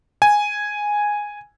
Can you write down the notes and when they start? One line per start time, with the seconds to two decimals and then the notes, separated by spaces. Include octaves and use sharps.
0.22 G#5